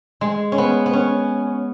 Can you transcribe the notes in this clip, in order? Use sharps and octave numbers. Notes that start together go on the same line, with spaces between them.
G#3
C#4
B3
B3
C#4